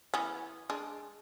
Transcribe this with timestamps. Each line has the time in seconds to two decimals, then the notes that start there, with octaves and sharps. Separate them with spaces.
0.14 E3 B3 C#4
0.70 G#3 D4